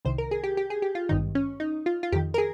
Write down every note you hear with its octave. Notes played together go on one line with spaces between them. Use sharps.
C2 C3 D#3 C5
A#4
G#4
G4
G4
G#4
G4
F4
G#1 G2 D#3 D#4
C#4
D#4
F4
F4
F2 D#3 G4
A#4
G#4